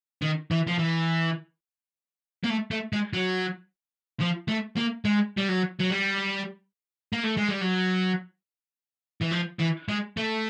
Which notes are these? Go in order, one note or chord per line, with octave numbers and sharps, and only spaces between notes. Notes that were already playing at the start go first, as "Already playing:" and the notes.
D#3
E3
F3
E3
A#3
A3
A3
G#3
F#3
F3
A3
A#3
G#3
G3
F#3
F#3
G3
A#3
A3
G#3
G3
F#3
E3
F3
E3
G#3
A3